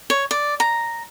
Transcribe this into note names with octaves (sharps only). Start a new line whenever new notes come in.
C#5
D5
A#5